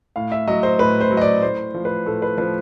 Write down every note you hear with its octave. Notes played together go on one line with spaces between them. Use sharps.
A2 F5
E5
F#3 D#5
C5
A2 B4
C5
F#3
D#5
D5
A2 C5
F3
B4
A2 A4
B4
F3 B4